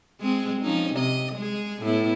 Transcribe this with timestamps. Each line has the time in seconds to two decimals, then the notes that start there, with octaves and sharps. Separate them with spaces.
0.21 G#3 C4 G#4
0.61 F3 C#4 D#4
0.95 C3 D#5
1.35 G#3 G#4
1.83 A2 B3 E4